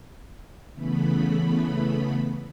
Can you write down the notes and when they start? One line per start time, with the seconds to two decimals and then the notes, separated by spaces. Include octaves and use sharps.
0.73 C#3 E3 A3 B3 B5